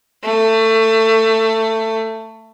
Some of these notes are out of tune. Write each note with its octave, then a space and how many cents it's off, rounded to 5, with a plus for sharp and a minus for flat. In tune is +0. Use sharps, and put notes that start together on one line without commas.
A3 +20